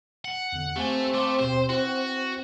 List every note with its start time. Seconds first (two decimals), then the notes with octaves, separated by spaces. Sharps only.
0.25 F#5
0.52 E2 D3
0.76 A3 C4 G4 F5 G#5
1.14 A3 F5 C6 D6
1.39 D#2 B2 G4 C5
1.69 E4 F#4 B4